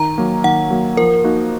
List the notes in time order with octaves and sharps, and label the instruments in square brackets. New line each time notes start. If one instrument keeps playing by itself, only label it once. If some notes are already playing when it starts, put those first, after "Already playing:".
Already playing: [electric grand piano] D#3 [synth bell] A#5
[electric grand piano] F#3 A#3
[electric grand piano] D#3 [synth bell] F#5
[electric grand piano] F#3 A#3
[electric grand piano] F3 [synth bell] A#4
[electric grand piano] A#3 D#4 F#4